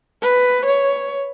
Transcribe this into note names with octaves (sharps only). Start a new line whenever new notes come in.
B4
C#5